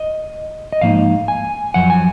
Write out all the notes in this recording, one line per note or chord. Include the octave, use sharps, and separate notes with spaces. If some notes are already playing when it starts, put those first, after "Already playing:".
Already playing: D#5
D#5
G#2 F3 A#3 D#4 F5
G#5
F#2 F3 F#5
G#5